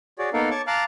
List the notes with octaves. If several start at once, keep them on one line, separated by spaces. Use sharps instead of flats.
F#4 G#4 C#5 D5
A#3 B3 D#4 A4 A#4 F5
C#5 A5 C#6 D6
F5 A5 A#5 D6 F6 F#6